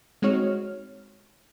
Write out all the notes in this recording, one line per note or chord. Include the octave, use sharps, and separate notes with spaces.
G#3 C4 D#4 F#4 C#5 F6